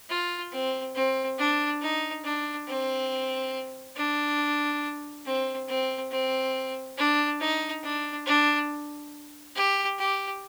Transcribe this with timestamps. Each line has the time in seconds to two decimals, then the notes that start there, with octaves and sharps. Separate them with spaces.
0.10 F4
0.52 C4
0.95 C4
1.38 D4
1.81 D#4
2.24 D4
2.67 C4
3.96 D4
5.25 C4
5.68 C4
6.11 C4
6.97 D4
7.40 D#4
7.83 D4
8.26 D4
9.55 G4
9.98 G4